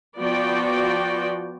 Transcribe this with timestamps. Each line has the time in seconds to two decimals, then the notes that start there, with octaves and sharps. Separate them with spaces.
0.19 F3 B3 F#4 D5 G5